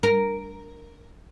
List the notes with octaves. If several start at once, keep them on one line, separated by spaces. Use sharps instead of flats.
A#4